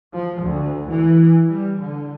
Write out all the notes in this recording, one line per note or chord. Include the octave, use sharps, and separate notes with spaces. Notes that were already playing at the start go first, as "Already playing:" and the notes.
F3
D2
E3
G3
D3